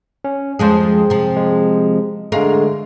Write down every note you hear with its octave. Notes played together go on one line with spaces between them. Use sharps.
C#4
F2 F3 G#3 G#4 C5
C3 F3
G#3
D3 G#3 A3 A#4 F5